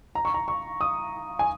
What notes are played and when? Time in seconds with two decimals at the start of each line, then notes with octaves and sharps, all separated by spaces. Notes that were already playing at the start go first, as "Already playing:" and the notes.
0.15 A#5
0.25 C#6
0.34 A#5
0.48 C#6
0.81 D#6
1.39 G#5